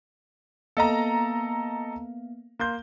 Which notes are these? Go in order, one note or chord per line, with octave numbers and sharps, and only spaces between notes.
A#3 B3 A4 D#5 F5 A#5
A#3 C6 G6